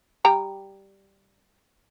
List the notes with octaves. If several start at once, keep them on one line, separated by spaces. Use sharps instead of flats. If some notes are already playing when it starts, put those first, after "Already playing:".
G3 G5 A#5